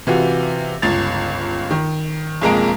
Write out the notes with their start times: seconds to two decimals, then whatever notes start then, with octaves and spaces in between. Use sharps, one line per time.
0.07 C3 E3 F4 F#4
0.82 G1 C#2 A6 F7
1.71 D#3
2.41 B1 F2 G#3 A#3 A#5 D7